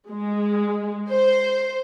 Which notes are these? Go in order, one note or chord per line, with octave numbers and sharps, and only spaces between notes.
G#3
C5